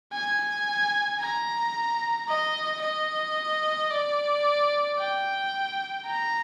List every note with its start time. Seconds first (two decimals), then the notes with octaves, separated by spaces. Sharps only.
0.13 G#5
1.20 A#5
2.28 D#5
2.82 D#5
3.91 D5
4.99 G5
6.06 A#5